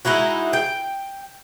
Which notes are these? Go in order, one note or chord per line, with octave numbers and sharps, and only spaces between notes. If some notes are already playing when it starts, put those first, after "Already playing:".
G#3 D#4 E4 F#4
G5